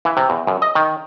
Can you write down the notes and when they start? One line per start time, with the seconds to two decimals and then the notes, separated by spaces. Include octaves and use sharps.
0.05 E3
0.17 C3
0.30 E2
0.47 F#2
0.62 D#5
0.75 D#3